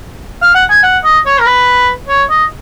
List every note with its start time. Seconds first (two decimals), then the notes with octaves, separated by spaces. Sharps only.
0.42 F5
0.55 F#5
0.70 G#5
0.84 F#5
1.04 D#5
1.26 C#5
1.39 A#4
1.46 B4
2.09 C#5
2.30 D#5